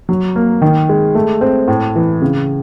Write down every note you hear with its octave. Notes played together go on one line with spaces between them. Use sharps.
F#3
A#3
D#3
G#3
A3
C4
A2
E3
C#3